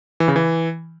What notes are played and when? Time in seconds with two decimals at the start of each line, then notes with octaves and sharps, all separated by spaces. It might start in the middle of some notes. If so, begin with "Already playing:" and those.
0.20 E3
0.28 C#3
0.36 E3